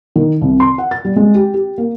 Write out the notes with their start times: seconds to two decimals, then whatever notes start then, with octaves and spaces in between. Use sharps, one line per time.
0.16 D#3
0.41 C2
0.60 C6
0.78 F#5
0.91 A6
1.05 G3
1.16 G#3
1.35 G4
1.54 G4
1.78 A#3